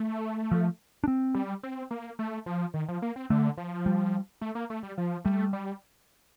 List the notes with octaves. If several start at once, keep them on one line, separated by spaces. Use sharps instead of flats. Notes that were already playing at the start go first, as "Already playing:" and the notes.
Already playing: A3
F3
D4
C4
G3
C4
A#3
A3
F3
D#3
F3
A#3
C4
D3 A3
F3
G3
A3
A#3
A3
G3
F3
G3 A3
G3